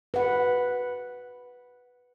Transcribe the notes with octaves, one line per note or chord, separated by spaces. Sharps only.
B4 F#5